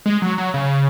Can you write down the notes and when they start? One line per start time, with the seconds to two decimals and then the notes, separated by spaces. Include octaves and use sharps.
0.06 G#3
0.22 F#3
0.38 F#3
0.54 C#3